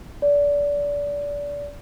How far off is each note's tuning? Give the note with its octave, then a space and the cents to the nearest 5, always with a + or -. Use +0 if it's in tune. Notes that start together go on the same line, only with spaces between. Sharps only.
D5 -25